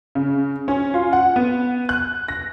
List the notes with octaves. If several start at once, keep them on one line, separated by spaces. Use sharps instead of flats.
C#3
C#4
F4
F#5
B3
F#6
A#6